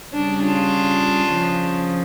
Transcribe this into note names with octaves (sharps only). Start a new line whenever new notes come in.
C#3 G3 D4
D4 F4
C#3 F3